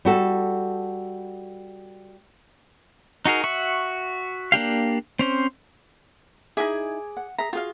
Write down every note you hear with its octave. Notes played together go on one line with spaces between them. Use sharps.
G3 F#4 A4
D#4 F#4 G#4 A#4
F#4 E5 C#6
A#3 D4 G4 F5
C4 C#4 C5
D#4 E4 G#4 D5 E5 G#5
F#5
G#4 E5 A#5
F4 F#4 G#4 F5